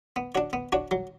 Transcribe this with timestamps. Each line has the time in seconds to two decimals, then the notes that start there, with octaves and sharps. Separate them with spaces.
0.16 B3
0.35 D4 F#4 C#5
0.53 B3
0.72 D4 F#4 C#5
0.91 F#3